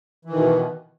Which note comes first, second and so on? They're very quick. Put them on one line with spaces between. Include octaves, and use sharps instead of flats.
E3 D#3 B2